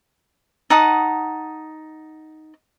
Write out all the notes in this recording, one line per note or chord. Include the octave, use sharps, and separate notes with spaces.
D#4 F#5 A5 D#6